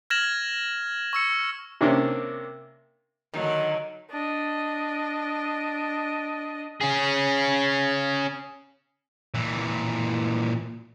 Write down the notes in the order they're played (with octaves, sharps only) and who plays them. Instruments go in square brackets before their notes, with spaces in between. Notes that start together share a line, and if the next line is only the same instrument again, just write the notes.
[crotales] F6 G#6 A#6 E7 F#7
C#6 E6 C#7
[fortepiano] C3 A#3 C#4 D4
[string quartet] D3 F#3 [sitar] D#3
[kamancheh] D4 D#5
[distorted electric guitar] C#4 G#4
A#2 E3